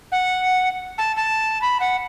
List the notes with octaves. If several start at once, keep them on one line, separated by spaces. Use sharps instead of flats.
F#5
A5
A5
B5
F#5